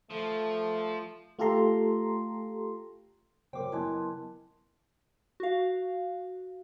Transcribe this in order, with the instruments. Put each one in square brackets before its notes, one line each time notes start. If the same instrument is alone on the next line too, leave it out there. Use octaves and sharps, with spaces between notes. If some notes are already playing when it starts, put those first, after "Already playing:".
[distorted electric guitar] F3 [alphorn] A3
[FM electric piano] A3 F4 G4 A4 A#5 C6
[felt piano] F#2 C5 [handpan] C#3 A#4 [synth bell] G5 D6
[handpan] F#3 B3 [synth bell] E4 [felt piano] D#5 G#5 F#6 [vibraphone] A5 C6
[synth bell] F#4 F5